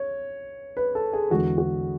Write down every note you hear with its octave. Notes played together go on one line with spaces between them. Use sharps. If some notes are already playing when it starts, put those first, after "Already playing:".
Already playing: C#5
B4
A4
G#4
E2 D3 G#3 F#4
F#4